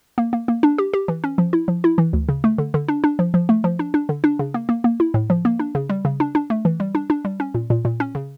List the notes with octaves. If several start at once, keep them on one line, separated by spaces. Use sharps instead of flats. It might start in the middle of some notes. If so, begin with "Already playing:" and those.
A#3
A#3
A#3
D4
G4
G4
E3
C#4
F3
E4
F3
E4
E3
D2
C#3
A3
D3
D3
D4
D4
F3
F3
A3
F3
D4
D4
D3
D4
C#3
A#3
A#3
A#3
E4
A2
F3
A#3
D4
C#3
G3
C#3
D4
D4
A3
E3
G3
D4
D4
G3
C#4
A#2
A#2
A#2
C#4
C#3